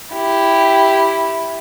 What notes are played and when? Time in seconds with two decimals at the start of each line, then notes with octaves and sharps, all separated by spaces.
0.13 E4 G4